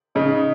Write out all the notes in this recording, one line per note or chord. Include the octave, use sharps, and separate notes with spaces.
C#3 D#4